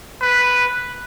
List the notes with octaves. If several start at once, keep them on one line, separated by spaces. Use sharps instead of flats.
B4